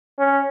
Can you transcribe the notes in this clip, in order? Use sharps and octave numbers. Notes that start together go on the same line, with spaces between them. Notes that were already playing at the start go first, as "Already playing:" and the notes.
C#4